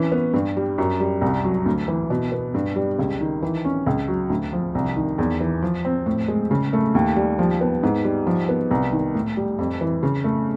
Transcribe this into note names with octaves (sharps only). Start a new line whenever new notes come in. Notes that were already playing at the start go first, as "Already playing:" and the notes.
Already playing: E3 C#4
B3
G2
G3
F#2
G3
C2
F#3
D2
E3
B2
B3
G2
G3
C#2
D#3
E3
C#4
C#2
F#3
D2
F3
C2
D#3
E2
E3
F3
C4
A2
G#3
C#3
A3
D#2
G3
F3
B3
G#2
G3
F3
B3
C2
D#3
A2
G3
F2
E3
C#3
A3